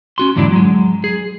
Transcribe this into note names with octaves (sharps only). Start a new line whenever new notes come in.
C#4 F#4 C6
E2 G#2 D3 F#3 D4 E4
F#3 G#3
G#4